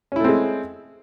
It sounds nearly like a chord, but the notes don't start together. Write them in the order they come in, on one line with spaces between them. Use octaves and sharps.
C#4 E4 A3 C4 G#3